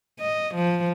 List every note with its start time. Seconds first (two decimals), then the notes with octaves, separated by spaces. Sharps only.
0.20 D#5
0.55 F3